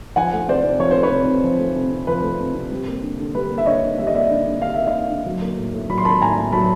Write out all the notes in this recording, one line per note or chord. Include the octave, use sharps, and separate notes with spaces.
F3 F#5 G#5
A3
C3 C5 D5
C3
F3 C#5
A3 C5
B4 C#5
C3
C3
F3
A3
C3
C3
F3 B4
A3
C3
C3
G3
A#3
D3
D3
G3 B4
A#3
E5
D3 C#5 D#5
D3
G3 E5
D#5
A#3 D5 E5
D3
D3
G3 F5
A#3 E5
D#5 F5
D3
D3
F#3
A#3
A2
A2
F#3 B5
C6
A#3 A5 B5
A2 G#5 A#5
A2
F#3 A5 B5